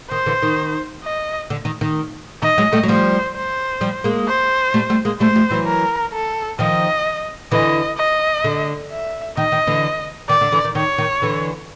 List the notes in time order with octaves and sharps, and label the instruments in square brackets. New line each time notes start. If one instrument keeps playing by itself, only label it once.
[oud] D#3 [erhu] C5
[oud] D3 E3
D#3
[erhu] D#5
[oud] D3
D#3
D#3
[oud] D#3 [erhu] D#5
[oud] F#3 G#3
G3 A3
F#3
[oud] F3 G3 [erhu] C5
[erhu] C5
[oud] F3 G3
G#3 A#3
[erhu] C5
[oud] G3 A3
G3 A3
G#3 A#3
[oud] G3 A3 [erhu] C5
[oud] F3 G3
E3 F#3
[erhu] A#4
A4
[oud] D#3 F3 [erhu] D#5
[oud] D3 E3 [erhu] D#5
[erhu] D#5
[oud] D3
[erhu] E5
[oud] D#3 [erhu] D#5
[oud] D#3
D3 E3
[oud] D#3 [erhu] D5
[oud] D3
D3 E3
D#3
[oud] D#3 [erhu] C#5
[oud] D#3
D3 E3